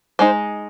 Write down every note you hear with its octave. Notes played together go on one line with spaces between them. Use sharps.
G#3 D#4 C5